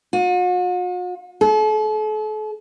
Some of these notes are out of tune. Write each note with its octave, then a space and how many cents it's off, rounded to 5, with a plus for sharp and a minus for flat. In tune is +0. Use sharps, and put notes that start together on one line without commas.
F#4 -45
A4 -40